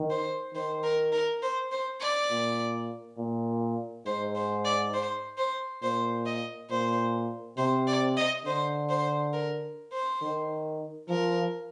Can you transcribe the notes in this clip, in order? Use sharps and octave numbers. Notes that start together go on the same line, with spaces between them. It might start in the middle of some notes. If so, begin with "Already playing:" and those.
Already playing: D#3
C5
D#3 C5
A#4
A#4
C5
C5
D5
A#2
A#2
G#2 C5
C5
D5
C5
C5
A#2 C5
D#5
A#2 C5
C3 C5
D5
D#5
D3 C5
C5
A#4
C5
D#3
F3 A#4